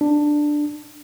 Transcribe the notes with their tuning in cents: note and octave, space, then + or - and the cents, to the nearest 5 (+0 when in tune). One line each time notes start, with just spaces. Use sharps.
D4 +10